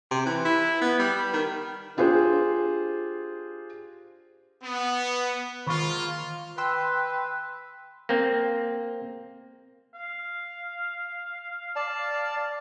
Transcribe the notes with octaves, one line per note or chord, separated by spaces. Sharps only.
C3
E3
E4
B3
G3
D#3
D4 F4 G4 G#4 C5
B3
D#3 G#3 A#3 F4 B5 C#6
B4 G5 C6 E6
A#3 C4
F5
D5 A5